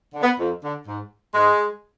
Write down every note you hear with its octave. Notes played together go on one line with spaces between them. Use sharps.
D3
B3
F2
D3
G#2
G#2 G#3